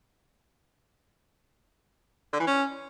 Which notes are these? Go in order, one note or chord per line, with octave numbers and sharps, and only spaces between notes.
D3
E3
C#4